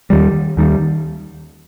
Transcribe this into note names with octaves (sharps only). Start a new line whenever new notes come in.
D#2 D#3 G3
D#2 D#3 G3